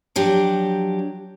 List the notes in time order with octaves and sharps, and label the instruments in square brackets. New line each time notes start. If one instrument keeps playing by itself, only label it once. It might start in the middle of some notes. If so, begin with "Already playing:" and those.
[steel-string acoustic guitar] F3 F#3 D4 G4